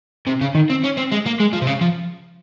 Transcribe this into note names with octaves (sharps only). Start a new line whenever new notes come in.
C3
C#3
D#3
C4
C#4
C4
G#3
A#3
G#3
F3
C3
C#3
F3